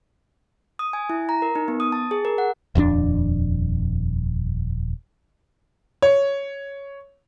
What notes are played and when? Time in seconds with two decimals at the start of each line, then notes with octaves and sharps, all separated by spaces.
0.79 D#6
0.93 G#5
1.10 E4
1.29 A#5
1.42 A#4
1.55 D#4
1.68 B3
1.80 D#6
1.92 A5
2.11 G#4
2.25 A#4
2.38 F#5
2.75 D#1 F2 F#3 D4
6.02 C#5